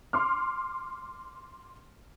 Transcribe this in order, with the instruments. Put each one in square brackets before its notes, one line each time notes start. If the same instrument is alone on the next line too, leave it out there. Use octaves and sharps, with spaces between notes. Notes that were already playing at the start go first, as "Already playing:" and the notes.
[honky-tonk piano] C6 D6 F6